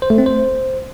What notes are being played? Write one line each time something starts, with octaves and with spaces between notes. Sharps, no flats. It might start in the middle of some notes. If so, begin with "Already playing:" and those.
C5
A3
C4
C5